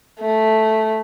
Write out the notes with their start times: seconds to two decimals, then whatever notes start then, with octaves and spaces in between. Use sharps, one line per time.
0.20 A3